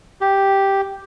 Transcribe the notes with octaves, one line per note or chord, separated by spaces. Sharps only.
G4